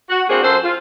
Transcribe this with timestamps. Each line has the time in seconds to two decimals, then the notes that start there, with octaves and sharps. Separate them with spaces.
0.09 F#4
0.29 A#3 C4 D4 F#4 G#4 C5
0.43 F#2 F4 A4 C5
0.63 F4